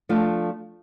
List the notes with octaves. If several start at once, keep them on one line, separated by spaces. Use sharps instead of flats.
F3 A3 D4 F4